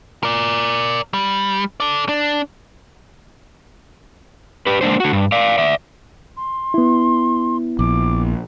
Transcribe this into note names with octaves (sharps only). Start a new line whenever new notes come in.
A#4 D5
G3
A4 D5
D4
G4 B4
G#3 A#3 D4 C5
D3 F#4
G2
D5 F5
D5 E5
C6
B3 E4
A#1 D6